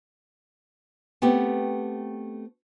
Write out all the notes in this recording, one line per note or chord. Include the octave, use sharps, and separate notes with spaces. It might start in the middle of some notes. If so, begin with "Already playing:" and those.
A3 B3 C4 G4